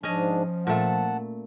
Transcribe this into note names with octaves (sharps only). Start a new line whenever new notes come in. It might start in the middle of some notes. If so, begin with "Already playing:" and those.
G#2 F3 C#4 D4 D#5
A#2 A3 F#5 A5